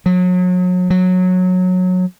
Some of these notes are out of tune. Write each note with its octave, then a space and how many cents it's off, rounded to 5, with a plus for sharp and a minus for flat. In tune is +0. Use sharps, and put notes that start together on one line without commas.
F#3 -35
F#3 -15